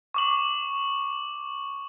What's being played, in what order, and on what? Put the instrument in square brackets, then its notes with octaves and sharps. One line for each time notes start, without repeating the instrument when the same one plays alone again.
[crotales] C#6 D6 F#7